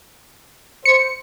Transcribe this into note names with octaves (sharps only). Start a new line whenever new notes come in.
C5 C#7